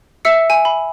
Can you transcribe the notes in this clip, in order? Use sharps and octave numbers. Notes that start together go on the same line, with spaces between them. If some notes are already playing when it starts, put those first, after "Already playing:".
E5 E6 C#7
G#5
B5